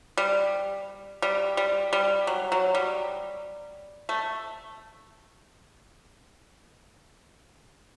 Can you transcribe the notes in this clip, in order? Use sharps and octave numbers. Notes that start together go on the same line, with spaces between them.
G3
G3
G3
G3
F#3
F#3
G3
A3